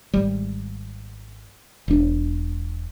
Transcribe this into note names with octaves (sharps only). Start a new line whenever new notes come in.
G#1 G3
E1 D4